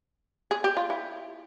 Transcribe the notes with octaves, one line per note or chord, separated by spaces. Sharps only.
G#4
G4
F4
E4